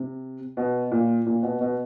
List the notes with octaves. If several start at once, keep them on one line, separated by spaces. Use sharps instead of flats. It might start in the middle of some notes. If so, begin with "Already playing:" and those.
Already playing: C3
B2
A#2
A#2
B2
B2